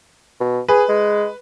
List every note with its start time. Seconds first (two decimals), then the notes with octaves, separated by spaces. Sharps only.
0.40 B2
0.68 G#4 B4
0.89 G#3